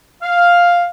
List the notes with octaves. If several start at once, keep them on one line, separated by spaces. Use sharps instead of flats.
F5